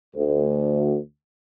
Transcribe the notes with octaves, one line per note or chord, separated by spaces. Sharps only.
D2